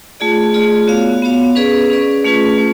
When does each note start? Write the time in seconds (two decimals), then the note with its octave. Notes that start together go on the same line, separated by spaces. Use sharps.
0.20 A3 F4 G#4 D5
0.54 A3 F4 G#4 D5
0.87 B3 F#4 C#5 F5
1.22 B3 F#4 C#5 F5
1.55 C#4 G#4 B4 D5
1.90 C#4 G#4 B4 D5
2.24 A3 C#4 F4 G#4 B4
2.58 A3